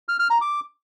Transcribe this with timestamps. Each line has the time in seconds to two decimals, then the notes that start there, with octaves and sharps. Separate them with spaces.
0.09 F6
0.19 F6
0.30 A#5
0.41 D6